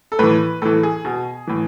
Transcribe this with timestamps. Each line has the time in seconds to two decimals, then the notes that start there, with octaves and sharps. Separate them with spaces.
0.12 A4
0.19 A2 E3 B4
0.62 A2 E3 A4
0.83 G#4
1.05 B2 G#4
1.47 A2 E3